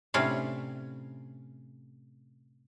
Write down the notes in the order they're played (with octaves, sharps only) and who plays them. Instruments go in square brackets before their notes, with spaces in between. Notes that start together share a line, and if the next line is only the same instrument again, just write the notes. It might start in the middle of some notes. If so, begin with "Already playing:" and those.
[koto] A2 C3 C#4 D4 C#5 F5